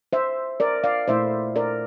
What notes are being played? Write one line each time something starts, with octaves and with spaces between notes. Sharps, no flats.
C5 E5
A#4 D5
D5 F5
A#2 A3 E4 C5 E5
A#4 D5